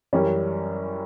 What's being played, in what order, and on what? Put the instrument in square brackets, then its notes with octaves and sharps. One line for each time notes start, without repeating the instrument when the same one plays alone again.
[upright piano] F#2 E3 G3 C#4